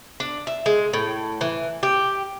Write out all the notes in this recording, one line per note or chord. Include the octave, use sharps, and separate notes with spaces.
D4
E5
G#3
A2
E3
G4